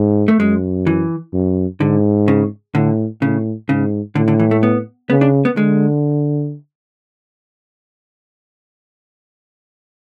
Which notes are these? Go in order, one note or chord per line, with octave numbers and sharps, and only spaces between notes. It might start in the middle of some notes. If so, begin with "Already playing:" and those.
Already playing: G#2
A3
F#2 G#3
E3
F#2
G#2 D3
C#3
A2 D3
A2 C#3
G#2 C#3
A2 D3
D3
E3
A3
B3
C#3 B3
D4
B3
D3 G#3